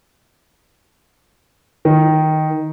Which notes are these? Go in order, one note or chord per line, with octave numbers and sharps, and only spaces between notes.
D#3